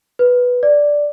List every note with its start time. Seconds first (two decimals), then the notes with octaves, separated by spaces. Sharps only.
0.19 B4
0.63 D5